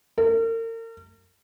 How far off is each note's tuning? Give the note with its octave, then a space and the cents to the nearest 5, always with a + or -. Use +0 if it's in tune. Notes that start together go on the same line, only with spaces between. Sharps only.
A#4 -40